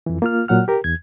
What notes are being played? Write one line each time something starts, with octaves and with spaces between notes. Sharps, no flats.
F2 E3
A#3 F4 F6
A#2 F#3 F#5 F6
G4 A#4
E2 G#6